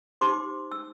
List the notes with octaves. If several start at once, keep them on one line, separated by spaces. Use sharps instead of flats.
D#4 G4 C5 C6 D6
E6